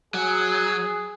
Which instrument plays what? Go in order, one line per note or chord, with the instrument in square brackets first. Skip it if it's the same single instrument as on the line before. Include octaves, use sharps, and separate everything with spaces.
[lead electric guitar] F#3 [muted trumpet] G#4